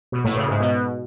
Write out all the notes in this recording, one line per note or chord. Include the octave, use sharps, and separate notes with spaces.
B2
A2
C#3
G#2
B2